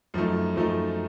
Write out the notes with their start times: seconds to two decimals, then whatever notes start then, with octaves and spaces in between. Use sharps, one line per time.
0.14 F#2 F3 A3 D#4
0.56 F#2 F3 A3 D#4